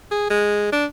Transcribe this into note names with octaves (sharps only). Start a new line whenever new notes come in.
G#4
G#3
D4